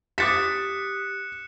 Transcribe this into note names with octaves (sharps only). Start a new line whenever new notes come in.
G4 D6 D#6 F#6 A6 B6 C#7 E7